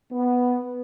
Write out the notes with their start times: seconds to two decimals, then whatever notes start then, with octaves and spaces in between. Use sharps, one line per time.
0.12 B3